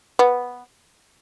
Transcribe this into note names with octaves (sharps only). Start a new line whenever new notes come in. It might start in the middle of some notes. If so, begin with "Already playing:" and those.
B3